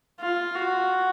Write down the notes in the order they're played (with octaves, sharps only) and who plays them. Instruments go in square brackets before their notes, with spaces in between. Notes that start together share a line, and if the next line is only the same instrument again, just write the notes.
[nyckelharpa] F4
F#4